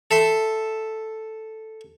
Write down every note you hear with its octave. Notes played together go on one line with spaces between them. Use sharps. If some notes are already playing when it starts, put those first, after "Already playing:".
A4 E5 C6